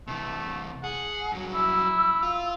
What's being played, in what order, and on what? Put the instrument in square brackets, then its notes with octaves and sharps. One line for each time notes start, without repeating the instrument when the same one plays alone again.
[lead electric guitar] C3 E3 [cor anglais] A3
[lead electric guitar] G#4 [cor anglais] F#5
[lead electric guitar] G2 F#3
[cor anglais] E4 [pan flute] E6
[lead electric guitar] F4